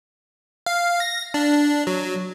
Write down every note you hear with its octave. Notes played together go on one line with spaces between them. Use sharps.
F5
A#6
D4
F#3